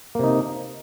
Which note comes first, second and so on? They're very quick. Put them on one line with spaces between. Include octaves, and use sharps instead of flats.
A#3 C3 D#4